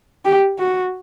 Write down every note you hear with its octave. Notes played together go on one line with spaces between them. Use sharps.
G4
F#4